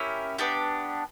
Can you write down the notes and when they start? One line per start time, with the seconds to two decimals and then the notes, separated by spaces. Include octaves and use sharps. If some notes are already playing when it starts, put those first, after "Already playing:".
Already playing: C#4 E4 G4 A#4
0.38 B3 D4 G4